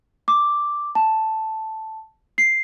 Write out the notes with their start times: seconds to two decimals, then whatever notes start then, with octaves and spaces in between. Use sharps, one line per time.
0.28 D6
0.95 A5
2.38 C7